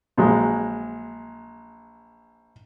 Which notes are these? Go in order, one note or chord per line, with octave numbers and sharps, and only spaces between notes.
A#1 F#3 G#3